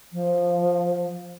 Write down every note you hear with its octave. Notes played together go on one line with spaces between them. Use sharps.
F3